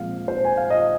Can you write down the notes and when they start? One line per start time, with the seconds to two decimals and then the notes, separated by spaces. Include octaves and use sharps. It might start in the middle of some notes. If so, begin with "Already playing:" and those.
Already playing: A#2 F3 G#3 C4 F5
0.28 C5
0.45 G#5
0.57 F5
0.70 D#5